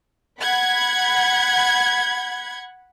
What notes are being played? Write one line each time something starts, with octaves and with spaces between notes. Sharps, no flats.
F#5 B5 G#6